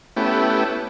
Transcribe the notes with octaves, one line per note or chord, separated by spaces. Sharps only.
A3 B3 C#4 E4 G4